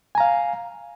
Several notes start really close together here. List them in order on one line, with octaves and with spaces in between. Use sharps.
G#5 A#5 F5